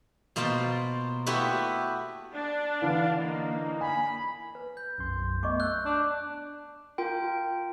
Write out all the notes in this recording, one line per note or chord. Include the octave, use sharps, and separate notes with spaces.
B2 A#3 F4 C5 A5
A3 B3 E4 F#4 G4 B4
D4
D3 E3 F5
A#3 D#4
G#5 B5
B4
G6
B1 F#2 C6
A3 B3 D#5 C#6 D6
E6 F#6 G6
D4
F4 A#4 G5